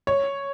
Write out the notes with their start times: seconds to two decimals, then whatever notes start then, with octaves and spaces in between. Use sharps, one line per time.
0.07 C#5